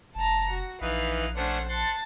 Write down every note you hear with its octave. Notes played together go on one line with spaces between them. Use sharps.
F1 A5 A#5
F#4
A#1 E3 D#4 B4 F5 F6
A3 C#4 D4 C5 F#5
F#5 A5 C6 A6